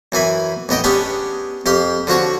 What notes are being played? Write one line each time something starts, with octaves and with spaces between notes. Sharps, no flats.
F#2 E3 G#5 B5
A1 B3 D#5 G5
B3 C#4 D4 G4 G#4
F2 G4 F5 C6
D3 F3 F#4 C#5